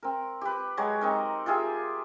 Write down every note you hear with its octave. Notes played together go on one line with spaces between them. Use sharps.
C4 A#4
G4 B4
F#3 G#3 G4 C#5
C4 D#4 A#4
F4 G4 G#4 E5